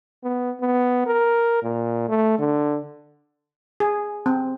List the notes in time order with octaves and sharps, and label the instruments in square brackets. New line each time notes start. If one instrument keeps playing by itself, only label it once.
[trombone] B3
B3
A#4
A#2
A3
D3
[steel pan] G#4
C4